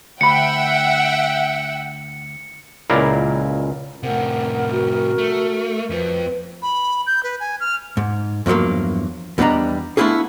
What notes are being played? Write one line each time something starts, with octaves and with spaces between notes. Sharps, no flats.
D2 E5 F#5 G5 B5 C#7
C#2 A#2 E4 A#4 D5 F5
A2 C3 A#4 F#5
F#4
A3
F2 F3 B4
B5
G6
B4
G#5
F6
G#2
E2 G2 F3 F#3 A#3
E2 G3 B3 D4 D#5 A#5
A3 B3 D4 E4 F4 G#4